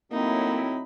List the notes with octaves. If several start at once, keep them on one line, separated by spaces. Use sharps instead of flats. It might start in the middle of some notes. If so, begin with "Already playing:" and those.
A2 F#3 A#3 C4 D#4 E4 B5